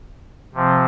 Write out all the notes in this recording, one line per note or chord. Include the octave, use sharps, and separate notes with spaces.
C3 F3 C4